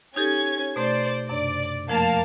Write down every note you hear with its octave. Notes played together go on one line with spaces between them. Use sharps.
C#4 D#4 G4 A4 G#6
B2 A3 C5 D5 C6
F#2 C3 D4 D5
F2 F3 A3 A#3 F5 A5